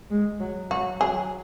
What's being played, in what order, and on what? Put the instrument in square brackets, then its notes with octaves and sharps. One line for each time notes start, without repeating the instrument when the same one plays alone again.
[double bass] G#3
F#3
[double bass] F#3 [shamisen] F#4
[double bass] F#3 [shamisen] G#4